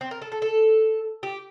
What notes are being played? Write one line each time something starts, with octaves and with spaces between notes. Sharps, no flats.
C4
A#4
A4
A4
A4
G4